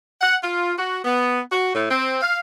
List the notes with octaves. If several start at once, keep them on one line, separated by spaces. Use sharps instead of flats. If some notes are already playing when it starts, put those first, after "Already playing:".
F#5
F4
F#4
B3
F#4
A2
C4
F5